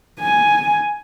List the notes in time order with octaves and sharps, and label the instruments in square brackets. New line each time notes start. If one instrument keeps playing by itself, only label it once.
[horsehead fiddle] G#5